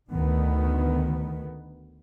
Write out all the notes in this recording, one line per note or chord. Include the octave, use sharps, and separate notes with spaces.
D2 D#3 B3